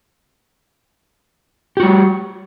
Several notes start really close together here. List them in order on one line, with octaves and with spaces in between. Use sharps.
G4 F#4 G3